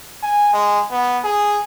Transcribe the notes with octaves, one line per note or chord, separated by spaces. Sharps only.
G#5
G#3
B3
G#4